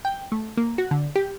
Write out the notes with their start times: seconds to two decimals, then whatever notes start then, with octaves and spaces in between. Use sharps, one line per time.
0.05 G5
0.32 A3
0.57 A#3
0.78 F#4
0.91 D3
1.16 G4